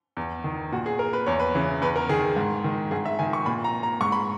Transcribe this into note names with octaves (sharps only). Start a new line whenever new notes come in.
E2
D#3
A#2 F#4
G#4
A#4
B4
E2 C#5
B4
C#3 E3
E2 B4
A#4
D#3 G#4
G#2
D#3
G#2 G#4
E5
D#3 G#5
C#6
A#2 B5
A#5
A#5
G#2 C#6
B5